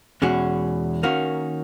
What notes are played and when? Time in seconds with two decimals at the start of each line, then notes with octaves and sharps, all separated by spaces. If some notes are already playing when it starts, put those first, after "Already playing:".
0.22 E2 B2 G#3 C#4 F#4
1.03 D#3 A#3 C#4 F#4